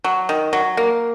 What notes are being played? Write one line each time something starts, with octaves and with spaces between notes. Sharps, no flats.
F#3
D#3
F#3
A#3